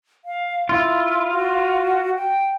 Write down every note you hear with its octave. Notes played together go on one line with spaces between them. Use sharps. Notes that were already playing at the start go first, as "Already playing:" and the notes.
F5
E4 F4
F#4
G5